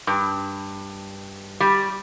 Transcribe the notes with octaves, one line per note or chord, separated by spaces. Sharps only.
G2
G3